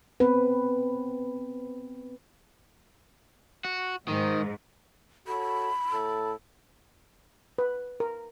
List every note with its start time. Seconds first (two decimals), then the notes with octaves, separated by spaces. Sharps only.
0.20 B3 C4 B4
3.65 F#4
4.08 G#2 D#3
5.27 F#4 A4 C#5 B5
5.92 A2 A4
7.58 B4
8.00 A#4